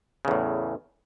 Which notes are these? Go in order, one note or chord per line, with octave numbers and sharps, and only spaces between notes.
E2 A2 C#3